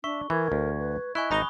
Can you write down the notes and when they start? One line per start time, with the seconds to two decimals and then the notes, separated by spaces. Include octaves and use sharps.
0.04 D4 E5 C#6
0.30 E3 A#4 G#6
0.52 D2
0.80 B4
1.15 E4 D#5 G#5 C#6 F#6
1.31 G#1 D#4 A#5 B5 D#6 G7